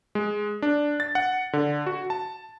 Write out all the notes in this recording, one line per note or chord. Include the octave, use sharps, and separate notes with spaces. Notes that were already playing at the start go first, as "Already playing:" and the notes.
G#3
D4
A6
F#5
D3
F#4
A5